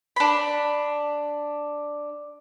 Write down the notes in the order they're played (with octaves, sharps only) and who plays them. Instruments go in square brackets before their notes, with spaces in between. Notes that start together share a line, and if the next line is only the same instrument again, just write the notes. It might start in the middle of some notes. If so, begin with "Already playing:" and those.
[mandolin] D4 B5